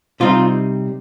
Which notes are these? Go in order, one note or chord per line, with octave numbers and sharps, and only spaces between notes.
C3 G3 C4 D#4 F4